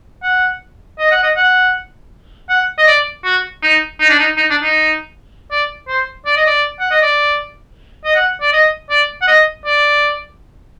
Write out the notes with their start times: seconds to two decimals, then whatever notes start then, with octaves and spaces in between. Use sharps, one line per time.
0.23 F#5
0.99 D#5
1.11 F#5
1.23 D#5
1.36 F#5
2.49 F#5
2.78 D#5
2.87 D5
3.25 F#4
3.63 D#4
4.00 D#4
4.10 D4
4.20 D#4
4.37 D#4
4.50 D4
4.63 D#4
5.51 D5
5.88 C5
6.26 D5
6.36 D#5
6.46 D5
6.80 F#5
6.91 D#5
7.02 D5
8.05 D#5
8.15 F#5
8.41 D5
8.53 D#5
8.90 D5
9.22 F#5
9.28 D#5
9.66 D5